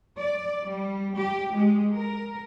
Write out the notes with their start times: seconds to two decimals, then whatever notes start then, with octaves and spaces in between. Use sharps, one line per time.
0.18 D5
0.68 G3
1.17 G4
1.56 G#3
1.95 A#4